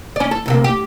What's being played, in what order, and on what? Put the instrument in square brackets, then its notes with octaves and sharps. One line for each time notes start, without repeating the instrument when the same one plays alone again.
[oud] C#4 D5
A4
D2 C3 A#3
G4